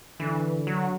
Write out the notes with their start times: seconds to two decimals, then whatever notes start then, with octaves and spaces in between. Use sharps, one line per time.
0.20 D3 E3
0.67 F#3